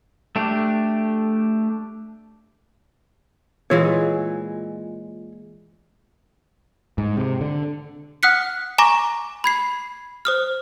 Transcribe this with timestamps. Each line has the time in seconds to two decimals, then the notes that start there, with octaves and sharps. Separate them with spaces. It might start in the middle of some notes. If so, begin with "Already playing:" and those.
0.36 A3 D4 G4
3.70 A#2 E3 G#3 F4 C#5
6.98 G#2
7.17 C3
7.41 D3
8.23 F#5 D#6 F6 F#6 B6 C#7
8.78 G#5 A#5 C#6 D6 A#6
9.44 B5 G#6 C7
10.25 C5 D#6 F6